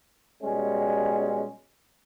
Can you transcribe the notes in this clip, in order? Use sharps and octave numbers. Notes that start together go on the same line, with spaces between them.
B2 G3 G#3 C#4